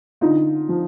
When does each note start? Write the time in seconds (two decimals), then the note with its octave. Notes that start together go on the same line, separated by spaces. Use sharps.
0.21 D3 D#4 F4
0.69 F3